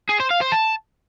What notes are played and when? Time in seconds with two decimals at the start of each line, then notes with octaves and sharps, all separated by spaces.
0.09 G#4
0.20 C5
0.31 F5
0.41 C5
0.52 A5